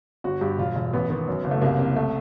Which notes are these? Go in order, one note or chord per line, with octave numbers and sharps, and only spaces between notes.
G1 F#4
G2 G4
E1 F4
E1
A1 B3
D#3 B3
F#2
F#1
A3
C2 A#3
C3 A#3
A3